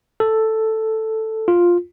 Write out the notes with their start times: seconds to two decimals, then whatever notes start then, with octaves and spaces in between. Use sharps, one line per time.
0.20 A4
1.48 F4